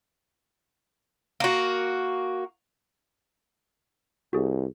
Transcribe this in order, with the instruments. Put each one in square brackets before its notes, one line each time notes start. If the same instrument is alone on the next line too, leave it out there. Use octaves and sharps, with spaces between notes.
[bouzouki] A#3 F#4
[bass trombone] C2 [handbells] F#4 G#4